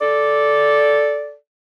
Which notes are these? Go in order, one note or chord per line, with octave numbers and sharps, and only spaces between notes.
A4 D5